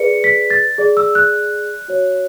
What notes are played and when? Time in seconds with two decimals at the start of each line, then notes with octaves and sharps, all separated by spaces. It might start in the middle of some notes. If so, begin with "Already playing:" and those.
Already playing: G#4 B4 D5 C#7
0.24 B6
0.50 A6
0.78 G#4 D5
0.97 E6
1.15 F#6
1.88 F#4 C#5